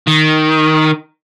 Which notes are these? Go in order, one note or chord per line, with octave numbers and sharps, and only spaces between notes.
D#3